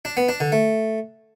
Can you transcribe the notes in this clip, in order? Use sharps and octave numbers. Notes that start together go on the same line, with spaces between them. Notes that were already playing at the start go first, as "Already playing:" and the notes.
D4
B3
D4
D3
A3